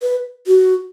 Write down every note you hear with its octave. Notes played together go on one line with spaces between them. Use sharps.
B4
F#4